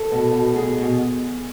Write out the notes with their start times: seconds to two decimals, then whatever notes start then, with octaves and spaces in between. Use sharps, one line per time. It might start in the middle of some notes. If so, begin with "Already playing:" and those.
Already playing: A4
0.12 B2
0.33 B2
0.56 B2 G#4
0.78 B2